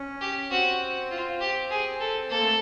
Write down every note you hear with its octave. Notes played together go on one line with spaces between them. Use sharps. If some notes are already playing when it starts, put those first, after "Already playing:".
Already playing: C#4
G4
C4 F#4
F4
G4
G#4
A4
A#3 A4
A3